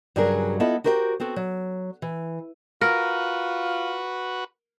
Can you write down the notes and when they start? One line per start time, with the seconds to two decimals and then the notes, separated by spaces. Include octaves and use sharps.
0.16 G2 C#3 F#3 G#4 A#4
0.60 B3 E4 F4 A4 D#5 E5
0.84 F#4 G4 A#4 C5 D#5 G5
1.20 B3 C4 F#4 A4
1.36 F#3
2.02 E3
2.81 F4 F#4 A#4 B4